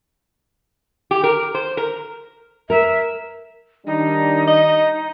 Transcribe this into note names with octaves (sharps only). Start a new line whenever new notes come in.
G4
A#4
C5
A#4
A#4 E5
D#3 G3 D4 D#4
D#5